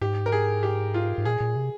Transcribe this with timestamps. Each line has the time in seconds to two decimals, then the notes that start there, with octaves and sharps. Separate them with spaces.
0.01 G#2 G4
0.26 A#4
0.32 G#4
0.63 G4
0.94 F4
1.18 G#2
1.25 A#2 G#4
1.41 A#2
1.56 C3